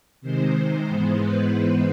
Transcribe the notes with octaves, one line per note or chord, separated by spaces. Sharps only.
C3 D#3 G#3 C5
C5
G#2 E3 G#3 B3
B4